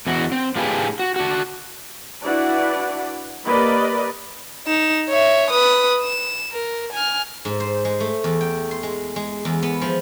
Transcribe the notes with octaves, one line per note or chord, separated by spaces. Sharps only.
E2 E3 F#4
C4
A2 D4 F4 G4 G#4 B4
F#4
D4 F#4
D4 E4 F#4 B4 D5 F#5
A#3 G4 B4 D5 D#5 B5
D#4 E7
C#5 E5
B4 D#6
E7
A#4
G#5 F6
G#2
C5
G#3
A3
E2
G5
C6
G#3
G#3
E2
B3
F3